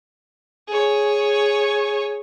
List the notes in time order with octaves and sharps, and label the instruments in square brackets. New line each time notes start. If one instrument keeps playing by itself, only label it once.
[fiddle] G#4 C#5